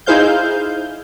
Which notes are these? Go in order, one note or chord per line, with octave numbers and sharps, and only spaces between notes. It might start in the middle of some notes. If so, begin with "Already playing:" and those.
D#4 E4 G#4 C5 F5 G6